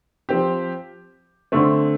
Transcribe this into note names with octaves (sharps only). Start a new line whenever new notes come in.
F3 C4 G4
D3 A3 C4